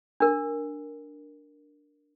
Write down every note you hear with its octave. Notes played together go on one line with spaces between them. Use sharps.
D4 A#4